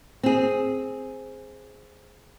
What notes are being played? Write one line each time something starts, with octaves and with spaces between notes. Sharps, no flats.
C4 G#4